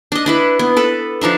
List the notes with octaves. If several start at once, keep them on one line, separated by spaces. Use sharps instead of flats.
D4 D#5
D4 E4 B4
B3
A4 B4
F3 D4 D#4 E5